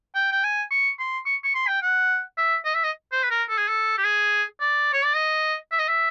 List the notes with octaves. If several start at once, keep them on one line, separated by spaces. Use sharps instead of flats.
G5
G5
G#5
C#6
C6
C#6
C#6
C6
G5
F#5
E5
D#5
E5
D#5
C5
B4
A#4
A4
G#4
A4
G4
G#4
D5
C#5
D5
D#5
E5
D#5
E5